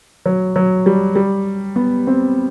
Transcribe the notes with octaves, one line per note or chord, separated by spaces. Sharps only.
F#3
F#3
G3
G3
B3
C4